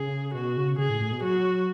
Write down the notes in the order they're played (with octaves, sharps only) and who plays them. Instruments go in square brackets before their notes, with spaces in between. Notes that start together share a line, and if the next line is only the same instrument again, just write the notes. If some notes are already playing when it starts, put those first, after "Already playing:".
Already playing: [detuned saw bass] C#3 [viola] G#4
[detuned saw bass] B2 [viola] F#4
[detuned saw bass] C#3
[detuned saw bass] C#3 [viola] G#4
[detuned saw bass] A2
A2
B2
[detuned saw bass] F#3 [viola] F#4